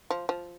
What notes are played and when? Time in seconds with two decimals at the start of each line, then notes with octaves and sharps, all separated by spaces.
0.10 F3
0.29 F3